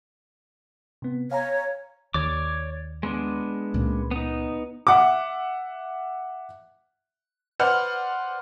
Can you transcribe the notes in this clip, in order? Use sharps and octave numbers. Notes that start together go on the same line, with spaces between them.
C3 B3
C#5 F5 G#5 A#5
D#2 C#5 D5 D6
G#3 B3 D4
C#2 A#2
B3 D#4
E5 F#5 D6
B4 C5 D5 F#5 F6 F#6